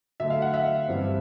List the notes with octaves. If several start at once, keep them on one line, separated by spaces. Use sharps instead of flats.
D3 F#3 A3 E5
F5
F#5
E5
G2 E3 G3 C4